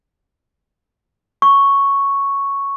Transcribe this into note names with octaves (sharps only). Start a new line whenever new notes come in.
C#6